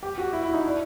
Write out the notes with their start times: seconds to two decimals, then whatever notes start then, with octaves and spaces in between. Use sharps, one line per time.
0.03 G4
0.18 F#4
0.33 E4
0.43 E4
0.53 D#4
0.64 D4